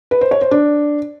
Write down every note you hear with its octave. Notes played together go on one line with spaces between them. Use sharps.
B4
C5
C#5
C5
D4